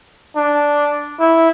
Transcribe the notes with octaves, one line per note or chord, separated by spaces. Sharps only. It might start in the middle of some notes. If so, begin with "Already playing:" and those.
D4
E4